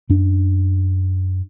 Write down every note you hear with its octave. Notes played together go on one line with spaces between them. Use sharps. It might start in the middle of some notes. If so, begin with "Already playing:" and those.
F#2 D4